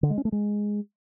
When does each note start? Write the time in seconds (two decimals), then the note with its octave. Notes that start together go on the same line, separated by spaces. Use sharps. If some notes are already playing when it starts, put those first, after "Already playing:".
0.03 D3
0.10 G#3
0.18 C#4
0.25 A3
0.32 G#3